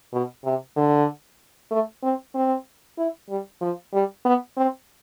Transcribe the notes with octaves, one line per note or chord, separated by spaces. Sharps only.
B2
C3
D3
A3
C4
C4
E4
G3
F3
G3
B3
C4